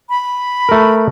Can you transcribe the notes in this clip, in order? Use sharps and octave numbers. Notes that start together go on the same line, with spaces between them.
B5
A3 A#4